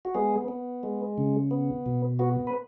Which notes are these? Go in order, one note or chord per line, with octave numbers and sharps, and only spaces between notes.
F#4
G#3 B3 G#4
B3
G#3
C#3
B3
B2
B3 F#4
B4